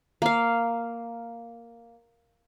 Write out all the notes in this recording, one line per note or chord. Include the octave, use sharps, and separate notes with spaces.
A#3 F5